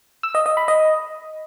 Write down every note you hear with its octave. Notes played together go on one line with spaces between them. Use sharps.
E6
D#5
D#5
B5
D#5